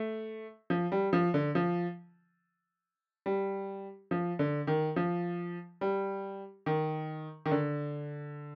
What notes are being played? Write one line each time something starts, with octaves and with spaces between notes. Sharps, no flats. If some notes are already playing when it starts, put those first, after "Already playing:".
Already playing: A3
F3
G3
F3
D3
F3
G3
F3
D3
D#3
F3
G3
D#3
D#3
D3